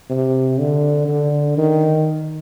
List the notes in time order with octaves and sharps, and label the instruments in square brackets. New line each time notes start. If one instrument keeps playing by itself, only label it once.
[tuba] C3
D3
D3
D#3